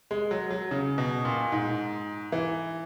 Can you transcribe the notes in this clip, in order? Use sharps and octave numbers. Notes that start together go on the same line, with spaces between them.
G#3
F#3
F#3
C#3
B2
A#2
G#2
E3